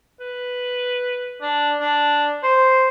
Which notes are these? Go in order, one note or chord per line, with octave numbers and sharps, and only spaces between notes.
B4
D4
D4
C5